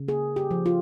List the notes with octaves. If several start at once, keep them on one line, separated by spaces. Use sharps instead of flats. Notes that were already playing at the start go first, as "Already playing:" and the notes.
Already playing: C#3
A#3 G#4
G4
F3
F4